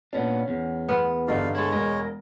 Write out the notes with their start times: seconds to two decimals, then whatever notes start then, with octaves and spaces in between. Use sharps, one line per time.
0.13 A#2 B3 C#4 D4
0.48 E2
0.89 B3 C6 D#6 F6
1.28 G2 D3 D#4 D5 D#5 F5
1.55 G#3 E4 A4 C#5
1.72 E1 A#4 D#5